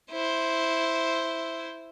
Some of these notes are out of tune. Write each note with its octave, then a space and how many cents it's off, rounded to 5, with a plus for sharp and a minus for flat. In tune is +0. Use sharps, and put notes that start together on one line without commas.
E4 +0 C5 +0